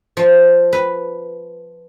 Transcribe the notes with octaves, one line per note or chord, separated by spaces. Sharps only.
F3
B4